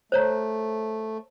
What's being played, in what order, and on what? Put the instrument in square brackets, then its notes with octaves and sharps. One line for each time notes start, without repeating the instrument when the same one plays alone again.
[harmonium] A3 [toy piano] C5 C#5 A#5